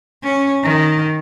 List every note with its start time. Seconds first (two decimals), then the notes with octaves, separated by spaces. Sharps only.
0.22 C#4
0.63 D#3